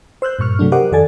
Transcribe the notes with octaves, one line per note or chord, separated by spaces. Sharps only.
C5 E6 F#6 G6
G2 A#2 C#6 F6
C3 F#3 A3 D4
G4 A#4 C5 D#5 F#5 D6
F2 D#3 A4 D5 G#5 A6